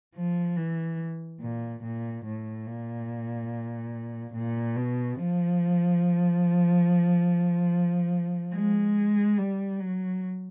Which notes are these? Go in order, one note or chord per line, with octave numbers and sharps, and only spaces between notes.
F3
E3
A#2
A#2
A2
A#2
A#2
B2
F3
G#3
G3
F#3